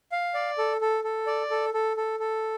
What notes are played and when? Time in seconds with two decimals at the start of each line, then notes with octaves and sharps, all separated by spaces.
0.12 F5
0.34 D5
0.58 A4
0.81 A4
1.04 A4
1.27 D5
1.51 A4
1.74 A4
1.97 A4
2.20 A4